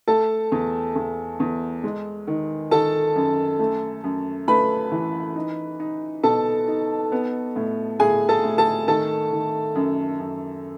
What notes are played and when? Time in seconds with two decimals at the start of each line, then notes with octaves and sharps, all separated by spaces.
0.08 A3 A4 A5
0.52 E2
0.96 E2
1.40 E2
1.84 G#3
2.27 D#3
2.71 D#3 A4 A5
3.16 F#2
3.59 A3
4.04 F#2
4.48 A3 B4 B5
4.92 E3
5.36 D#4
5.80 D#4
6.23 B2 A4 A5
6.68 D#4
7.12 B3
7.56 A2
8.00 A2 G#4 G#5
8.29 A4 A5
8.44 A2
8.58 A4 A5
8.88 D#3 A4 A5
9.32 D#3
9.75 F#2
10.20 F#2